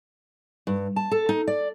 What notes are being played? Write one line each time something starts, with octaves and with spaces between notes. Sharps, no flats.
G2
A5
A4
D#4
D5